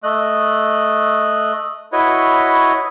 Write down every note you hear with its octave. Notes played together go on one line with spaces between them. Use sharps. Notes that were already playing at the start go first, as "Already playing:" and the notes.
A3 D#5 F#6
E4 F#4 B4 C#5 D#5